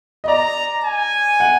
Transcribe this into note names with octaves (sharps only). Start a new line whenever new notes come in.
D#5
D5 A#5
G#5
F#5